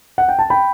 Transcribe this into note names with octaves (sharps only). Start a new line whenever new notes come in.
F#5
G5
A5
G5 B5